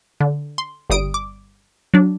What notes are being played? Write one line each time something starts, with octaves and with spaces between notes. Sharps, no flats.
D3
C6
G1 G3 D#6 D7
D6
F#3 D4